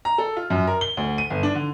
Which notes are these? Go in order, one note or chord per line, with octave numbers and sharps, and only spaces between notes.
A#5
A4
F4
F#2
A#4
G7
D2
D#7
G1
D4
D3